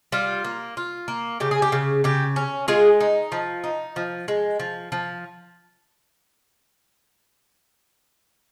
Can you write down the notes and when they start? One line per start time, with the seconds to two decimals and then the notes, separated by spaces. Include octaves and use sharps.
0.12 G3 F4
0.44 A#3
0.77 F4
1.08 A#3
1.40 C#3 G4
1.51 G#4
1.62 G4
1.72 C#3
2.04 C#3 G4
2.36 C#4
2.68 G#3 F4 G#4
3.00 D#4
3.32 F3
3.64 D#4
3.96 F3
4.28 G#3
4.60 F3
4.92 F3